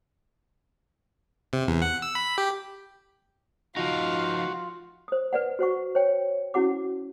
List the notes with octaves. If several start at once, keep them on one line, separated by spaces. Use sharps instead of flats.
C3
E2
F#5
E6
B5
G4
F3 D#4 F4 F#4 F5
C5 D#6
B4 D5 F#5
F#4 C5 F#5 C#6
C5 C#5 G5
C#4 E4 F#4 F#5 D6